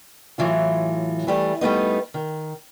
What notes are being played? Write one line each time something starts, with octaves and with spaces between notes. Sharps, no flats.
A2 E3 F#3 F4
E3 G3 A3
G3 A3 B3 D#4
D#3